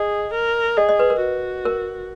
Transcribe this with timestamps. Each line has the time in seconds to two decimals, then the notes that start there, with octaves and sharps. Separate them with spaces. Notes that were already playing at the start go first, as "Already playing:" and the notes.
Already playing: G#4 D#5
0.34 A#4
0.77 G#4 D#5
0.89 D#5
0.99 B4
1.10 A#4
1.21 F#4
1.65 A#4